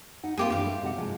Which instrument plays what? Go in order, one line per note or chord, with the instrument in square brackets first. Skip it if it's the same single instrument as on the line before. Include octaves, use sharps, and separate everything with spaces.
[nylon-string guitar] D#4 F#5
[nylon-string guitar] A3 A#3 C4 [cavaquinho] F4 G4 G#4
[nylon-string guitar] G2 E3 [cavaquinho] G4 F5
[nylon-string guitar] A3
G#2 C3 F#5
C3 F3 G#3